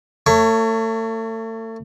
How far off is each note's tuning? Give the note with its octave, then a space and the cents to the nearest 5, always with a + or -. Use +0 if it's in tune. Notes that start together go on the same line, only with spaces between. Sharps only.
A3 +35 C#5 +0